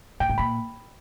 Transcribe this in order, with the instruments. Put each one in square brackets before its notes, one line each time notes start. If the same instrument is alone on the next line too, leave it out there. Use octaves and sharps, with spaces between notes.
[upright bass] A#2 [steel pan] G5
[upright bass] A2
[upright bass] A#2 [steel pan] B5